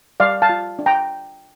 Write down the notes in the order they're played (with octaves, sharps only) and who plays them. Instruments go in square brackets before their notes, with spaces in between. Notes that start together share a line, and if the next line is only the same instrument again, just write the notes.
[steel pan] G3 D5 F5
F5 A5
F4
D4
G5 A#5